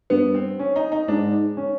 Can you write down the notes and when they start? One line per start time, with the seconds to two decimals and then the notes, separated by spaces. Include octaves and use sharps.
0.10 G2 B3
0.34 C4
0.59 C#4
0.76 D#4
0.92 D#4
1.08 G#2 D4
1.57 C#4